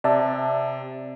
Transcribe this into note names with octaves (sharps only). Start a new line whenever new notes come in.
C3 D5 E5 A5